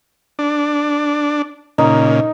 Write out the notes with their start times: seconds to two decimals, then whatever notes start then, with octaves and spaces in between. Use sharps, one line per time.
0.39 D4
1.78 A#2 C#3 D#4